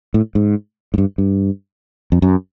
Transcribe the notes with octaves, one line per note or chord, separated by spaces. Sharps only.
A2
G#2
G#2
G2
G2
F2
F#2